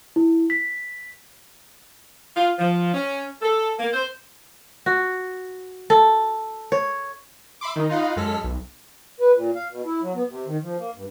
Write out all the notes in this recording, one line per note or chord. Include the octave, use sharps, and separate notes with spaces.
E4
B6
F4
F3
C#4
A4
A#3
C5
F#4
A4
C#5
E5 B5 C6 D6
D#3 D#4
D#4 F4 F5 F#5 B5
F#2 G#3 A4 F6 B6
B1
B4
A#2
F5
B2
E4
F#3
B3
C3
D#3
F3
A#3
G2